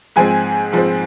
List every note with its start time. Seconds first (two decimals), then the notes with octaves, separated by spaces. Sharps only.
0.16 G#2 F3 G#3 C4 G#5
0.73 G#2 F3 G#3 C4